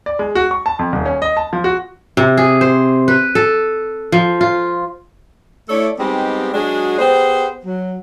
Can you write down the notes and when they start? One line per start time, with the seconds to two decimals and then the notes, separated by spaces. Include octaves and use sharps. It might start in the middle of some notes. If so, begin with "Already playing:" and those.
0.06 D5
0.19 G#3
0.35 F#4
0.51 C#6
0.66 A5
0.79 F2
0.93 D#1
1.06 C#4
1.22 D#5
1.37 A5
1.53 F3
1.64 F#4
2.17 C3
2.37 G#4
2.61 C5
3.08 B4
3.35 A4
4.12 F3
4.41 F4
5.69 A3 E4 A4 C#5 D5
5.99 G3 G#3 B3 C4 D#4 G4
6.54 F#3 G#3 D4 F#4 G#4
6.98 B3 G4 G#4 C5
7.65 F#3